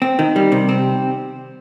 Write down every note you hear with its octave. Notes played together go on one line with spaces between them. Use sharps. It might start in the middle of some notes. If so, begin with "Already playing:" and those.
C4
D#3
G3
C3
C4